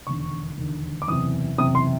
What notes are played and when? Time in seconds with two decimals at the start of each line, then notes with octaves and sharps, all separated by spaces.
0.07 E1 D#2 D3 C#6
0.58 E1 D#2 D3
1.02 D6
1.08 F#1 E2 C3 D#6
1.58 F#1 E2 C3 D#6
1.75 C6